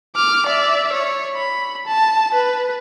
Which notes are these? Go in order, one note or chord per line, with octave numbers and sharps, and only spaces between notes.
D6 F6
D5 E5
C#5
B5
A5
B4